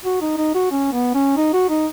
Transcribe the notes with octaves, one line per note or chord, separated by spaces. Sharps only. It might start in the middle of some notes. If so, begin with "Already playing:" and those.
F#4
D#4
D#4
F#4
C#4
B3
C#4
D#4
F#4
D#4